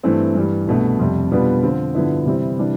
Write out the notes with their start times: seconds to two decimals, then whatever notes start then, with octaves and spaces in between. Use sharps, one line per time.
0.03 G2 E3 A3 C4
0.35 G2 E3 G3
0.67 C2 B2 A3 D4
0.99 F2 C3 G3
1.31 B2 G3 B3 D4 F4
1.63 D3 F3 C4 F4
1.95 G2 D3 F3 B3 E4
2.26 C3 E3 G3 C4 E4
2.59 C3 E3 G3 D4